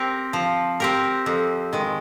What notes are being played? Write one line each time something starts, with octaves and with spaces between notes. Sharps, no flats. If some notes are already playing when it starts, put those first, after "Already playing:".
Already playing: C4 G4 A#4
F3
C4 G4 A#4
F2
D#3 G#3